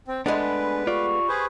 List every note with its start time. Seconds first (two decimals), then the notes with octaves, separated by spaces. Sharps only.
0.08 C4
0.26 G#3 A3 B3 D4 B4 G#5 B5 C6
0.87 F4 G4 D5 B5 C#6
1.29 G#4 B4 C5